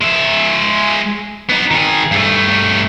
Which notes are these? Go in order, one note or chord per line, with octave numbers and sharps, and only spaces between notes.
G#3 E5
B3 D#4
D#3 G#4
G2 A3